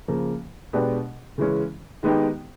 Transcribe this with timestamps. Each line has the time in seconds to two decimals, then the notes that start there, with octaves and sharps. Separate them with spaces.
0.08 C#3 F3 A#3
0.73 B2 G#3 B3 D4 G4
1.38 C#3 E3 G#3 C#4
2.03 D#3 G#3 B3 D#4 G4